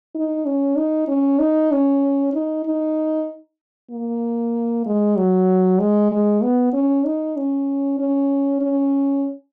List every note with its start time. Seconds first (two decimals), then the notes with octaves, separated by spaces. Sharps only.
0.15 D#4
0.46 C#4
0.77 D#4
1.08 C#4
1.39 D#4
1.72 C#4
2.34 D#4
2.66 D#4
3.91 A#3
4.86 G#3
5.17 F#3
5.80 G#3
6.12 G#3
6.43 B3
6.73 C#4
7.05 D#4
7.37 C#4
7.99 C#4
8.62 C#4